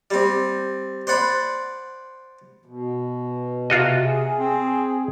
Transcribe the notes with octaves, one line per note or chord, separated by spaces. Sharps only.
G3 C4
C5 D5 F#5 B5 C6
B2
C3 F4 F#4 D#5
G#4
C4